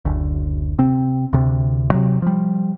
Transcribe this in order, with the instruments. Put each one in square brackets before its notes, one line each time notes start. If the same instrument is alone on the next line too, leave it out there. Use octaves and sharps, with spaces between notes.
[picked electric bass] F#1 D2
C3 C4
D2 C3
C3 F#3
F3 G3